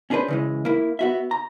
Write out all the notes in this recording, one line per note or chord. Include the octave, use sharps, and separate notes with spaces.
C#4 D4 G#4 A4 B4 C5
C#3 E3 G#3
A#3 E4
B3 F#4 E5
A#5